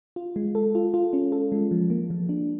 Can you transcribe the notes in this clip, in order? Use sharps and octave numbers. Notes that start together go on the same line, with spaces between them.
F4
G#3
A4
F4
F4
C#4
A4
G#3
F3
A#3
F3
D4